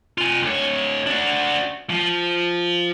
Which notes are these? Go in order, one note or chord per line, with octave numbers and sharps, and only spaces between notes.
F4 G#5
D2 C#5
D4 F#4
F3